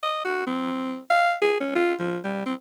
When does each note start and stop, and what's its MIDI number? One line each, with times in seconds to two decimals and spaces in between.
0.03 0.20 75
0.25 0.43 66
0.46 0.98 60
1.10 1.34 77
1.42 1.58 68
1.60 1.72 61
1.75 1.94 65
2.00 2.18 53
2.24 2.44 55
2.46 2.54 60